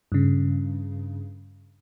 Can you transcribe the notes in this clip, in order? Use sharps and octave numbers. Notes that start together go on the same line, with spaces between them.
G2 C#3